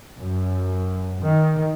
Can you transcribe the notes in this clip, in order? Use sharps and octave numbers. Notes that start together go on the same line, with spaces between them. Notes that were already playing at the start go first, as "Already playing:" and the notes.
F#2
D#3